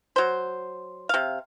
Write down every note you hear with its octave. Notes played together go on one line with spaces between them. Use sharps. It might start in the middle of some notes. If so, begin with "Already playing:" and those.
F#3 C5
C3 F5